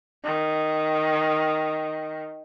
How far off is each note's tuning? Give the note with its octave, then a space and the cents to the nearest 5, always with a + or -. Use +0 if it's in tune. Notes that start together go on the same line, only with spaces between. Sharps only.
D#3 +0